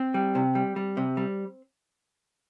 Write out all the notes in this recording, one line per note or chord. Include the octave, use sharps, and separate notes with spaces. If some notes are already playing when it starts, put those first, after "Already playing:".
Already playing: C4
G3
C3
G3
G3
C3
G3